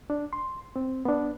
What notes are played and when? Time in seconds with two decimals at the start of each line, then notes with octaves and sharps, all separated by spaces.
0.10 D4
0.33 C6
0.76 C4
1.05 B3 D4